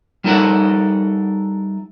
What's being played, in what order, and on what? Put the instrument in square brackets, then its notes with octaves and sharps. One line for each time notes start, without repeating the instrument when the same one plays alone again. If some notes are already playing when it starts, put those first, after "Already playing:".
[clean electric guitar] G3 D#4 E4 A4 A#4 F#5